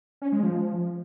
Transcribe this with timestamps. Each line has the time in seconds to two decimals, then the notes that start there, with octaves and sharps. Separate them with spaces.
0.22 C#4
0.32 G#3
0.43 F3